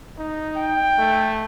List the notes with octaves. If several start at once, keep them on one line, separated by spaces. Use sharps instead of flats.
D#4
G5
A3